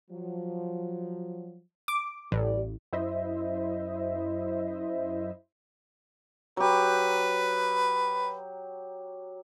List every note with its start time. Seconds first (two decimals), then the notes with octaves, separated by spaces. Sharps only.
0.11 F3 F#3
1.88 D6
2.32 A1 G3 D5
2.93 F#2 E4 C5 D#5 E5
6.57 F#3 G4 B4